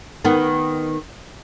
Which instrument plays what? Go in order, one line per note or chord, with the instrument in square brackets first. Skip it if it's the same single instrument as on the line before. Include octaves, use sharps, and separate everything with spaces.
[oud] D#3 B3